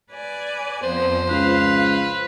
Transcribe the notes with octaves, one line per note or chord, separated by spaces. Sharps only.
B4 D5 G#5
F2 F3 B3 C5
C#2 B4 F5